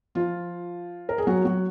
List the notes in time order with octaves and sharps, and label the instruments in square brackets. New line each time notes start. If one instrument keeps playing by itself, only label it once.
[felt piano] F3 F4
A#4
G#4
F#3 F#4
F#3 F#4